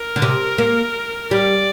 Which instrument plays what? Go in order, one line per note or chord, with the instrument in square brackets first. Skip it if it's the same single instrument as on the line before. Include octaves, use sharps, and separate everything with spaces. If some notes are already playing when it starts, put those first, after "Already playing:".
Already playing: [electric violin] A#4
[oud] D3
C3
A#3
[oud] G3 [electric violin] D5